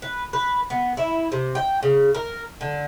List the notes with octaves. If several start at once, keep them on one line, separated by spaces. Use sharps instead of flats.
B4
B4
B3
E4
C3
G5
C#3
A#4
D3